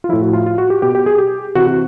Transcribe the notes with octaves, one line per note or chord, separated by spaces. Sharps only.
F4
A2 F3 E4
F#4
F4
F4
F#4
G4
B2 G4
G4
G#4
G4
C3 E3 F#4
F#4